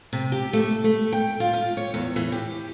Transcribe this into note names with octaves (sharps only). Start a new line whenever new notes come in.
C3
G4
A3
A3
G5
F4
F4
C#5
E2
E3
G4